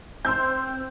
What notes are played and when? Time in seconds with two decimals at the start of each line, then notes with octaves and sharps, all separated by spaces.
0.25 C4 C6 E6 G6